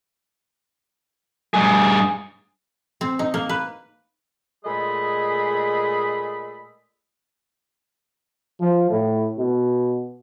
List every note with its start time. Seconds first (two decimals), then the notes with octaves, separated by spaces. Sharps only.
1.54 G2 G#4
3.01 C4
3.19 D#4
3.34 A#3
3.49 B4
4.64 A#2 G#3 A3 G#4 D#5 B5
8.60 F3
8.89 A2
9.38 B2